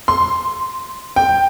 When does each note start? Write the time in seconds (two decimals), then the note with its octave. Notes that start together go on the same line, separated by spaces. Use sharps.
0.08 C6
1.16 G5